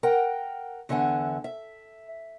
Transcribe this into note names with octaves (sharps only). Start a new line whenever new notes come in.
A#4 F#5 G5
E2 D3 E5 F#5 G#5
E5